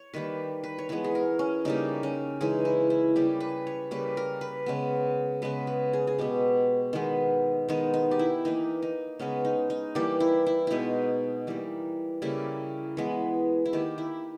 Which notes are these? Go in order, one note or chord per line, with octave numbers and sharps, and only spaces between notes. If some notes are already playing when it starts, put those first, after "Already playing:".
Already playing: C#5
D#3 G3 A#3 B4
B4
C#5
E3 G#3 B3 B4
G#4
A#4
C#4
C#3 G3 A#3 D#4
C#4
C#3 E3 G#3 D#4
E4
E4
C#3 G3 A#3 G4
B4
C#5
C#3 G3 A#3 B4
A#4
B4
C#3 G#3 B3
C#3 G#3 B3 B4
B4
G#4
G#4
B2 G#3 B3 G4
D#3 G#3 B3
D#3 G#3 B3 D#4
D#4
G4
E4
E3 A#3 D#4
D#4
C#3 G#3 B3 C#4
D#4
D#4
E3 G3 A#3 G4
E4
E4
B2 G#3 B3 D#4 E4
E3 G3 A#3
C#3 G3 A#3 E4
E3 G#3 B3
E4
D#3 A#3 G4
E4